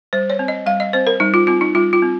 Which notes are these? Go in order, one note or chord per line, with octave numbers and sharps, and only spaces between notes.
G3 C5
C#5
C4
D#5
G3 F5
D#5
C4 C5
A#4
G3 D#4
F4
C4 F4
D#4
G3 F4
F4
C4